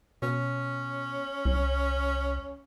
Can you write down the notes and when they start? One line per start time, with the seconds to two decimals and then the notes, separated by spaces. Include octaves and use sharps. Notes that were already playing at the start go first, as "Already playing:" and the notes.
0.22 B2 C#4
1.45 C2